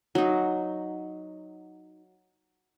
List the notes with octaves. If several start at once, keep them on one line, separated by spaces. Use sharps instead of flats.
F#3 D#4